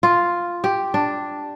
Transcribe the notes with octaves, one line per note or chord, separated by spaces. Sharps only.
F4
G4
D4